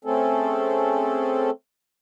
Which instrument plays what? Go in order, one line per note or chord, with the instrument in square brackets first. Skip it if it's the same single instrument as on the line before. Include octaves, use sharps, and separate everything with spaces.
[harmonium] A3 C4 C#4 G#4 A4